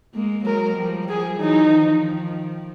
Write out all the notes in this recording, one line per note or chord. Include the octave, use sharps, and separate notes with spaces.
G#3 A#3
F#3 G#3 A#4
F3 G3
F3 G3 G#4
E3 F#3 D#4
D#3 F3